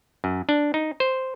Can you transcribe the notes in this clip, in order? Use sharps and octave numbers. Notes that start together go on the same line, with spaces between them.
F#2
D4
D#4
C5